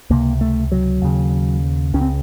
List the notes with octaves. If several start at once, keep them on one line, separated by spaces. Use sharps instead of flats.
C#2 C3 A#3
A3
F#3
D#2 C#3
C#2 C#3 C#4
C4